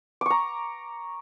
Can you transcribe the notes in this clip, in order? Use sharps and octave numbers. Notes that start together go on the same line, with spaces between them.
A#5 C#6 D6